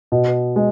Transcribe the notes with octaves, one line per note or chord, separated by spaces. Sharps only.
B2
G#3